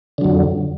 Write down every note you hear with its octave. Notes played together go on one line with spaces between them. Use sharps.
F2 D3 F#3